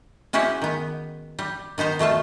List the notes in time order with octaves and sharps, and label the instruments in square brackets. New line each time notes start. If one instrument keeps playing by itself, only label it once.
[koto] G#3 C#4 E4 F#4 G4
D#3 B3
G3
D#3 B3 D#4 C5
B2 A3 F4 A5